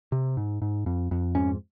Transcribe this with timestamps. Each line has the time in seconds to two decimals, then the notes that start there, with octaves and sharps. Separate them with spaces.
0.12 C3
0.37 G#2
0.62 G#2
0.86 F2
1.11 F2
1.35 G#2 C#4